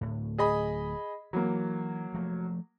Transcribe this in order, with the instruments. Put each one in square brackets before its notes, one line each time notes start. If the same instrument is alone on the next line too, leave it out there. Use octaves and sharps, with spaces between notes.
[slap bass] D1 A2
[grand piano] G#4 D#5 B5
[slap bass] E3 [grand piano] F#3 A#3
[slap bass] F3 A3